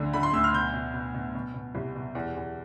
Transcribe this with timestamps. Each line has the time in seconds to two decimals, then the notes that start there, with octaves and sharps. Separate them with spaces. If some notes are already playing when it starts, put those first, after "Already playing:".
Already playing: D2 D3
0.13 D3 B5
0.23 C6
0.33 D2 E6
0.44 F6
0.53 B2 G6
0.74 B2
0.94 B2
1.14 B2
1.35 B2
1.54 B2
1.75 C2
1.95 B2
2.15 E2
2.36 E2